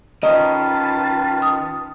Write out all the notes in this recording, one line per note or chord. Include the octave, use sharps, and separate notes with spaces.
D#3 C#4 F4 B4 D#5 A5
D#6